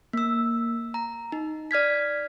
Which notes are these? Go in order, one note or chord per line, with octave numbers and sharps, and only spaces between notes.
A#3 E6
A#5
D#4
D5 F6 G#6 B6